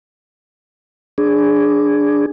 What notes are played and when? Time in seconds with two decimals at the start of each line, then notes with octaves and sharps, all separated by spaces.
1.18 D4 G#4